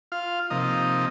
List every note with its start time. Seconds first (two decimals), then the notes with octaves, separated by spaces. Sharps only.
0.12 F4 F5
0.50 C3 F3 A#3 D#4 D#5